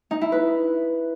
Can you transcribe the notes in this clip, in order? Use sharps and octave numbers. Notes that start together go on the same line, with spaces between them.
D#4
E4
B4